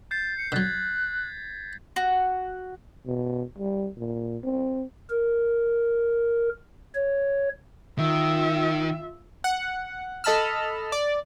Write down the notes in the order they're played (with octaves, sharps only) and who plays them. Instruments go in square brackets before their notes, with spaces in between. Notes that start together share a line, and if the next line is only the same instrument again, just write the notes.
[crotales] G6 C7 [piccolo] A6
[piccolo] C#7
[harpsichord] D3 F#3 [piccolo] F#6 [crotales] G#6 A6 B6
[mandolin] F#4
[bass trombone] B2
G3
A#2
C4
[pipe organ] A#4
C#5
[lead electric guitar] D#3 [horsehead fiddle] F4 E5
[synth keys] F#5
A4 D#5 A5 B5 E6 F6
D5